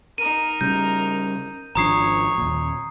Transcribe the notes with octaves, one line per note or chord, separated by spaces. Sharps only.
D#4 A#4 D#7
C#3 G3 G6
G#1 F3 D4 C#5 A#5 D#6 C7
D#2 A#2